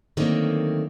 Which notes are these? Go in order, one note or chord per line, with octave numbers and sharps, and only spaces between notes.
D3 D#3 F#3 A3 A#3 C4